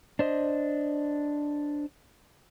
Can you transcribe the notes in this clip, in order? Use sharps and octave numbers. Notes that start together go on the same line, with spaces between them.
D4 C5 D#5